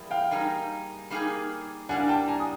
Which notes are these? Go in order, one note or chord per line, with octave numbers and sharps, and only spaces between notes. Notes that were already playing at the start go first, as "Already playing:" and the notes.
Already playing: E3 G3 A#3 G#4
F5 G5
G3 A#3 D#4 G#4
G3 A#3 D#4 G#4
G3 A#3 D4 F#5 G#5
G5 A5
G#5 A#5
D#6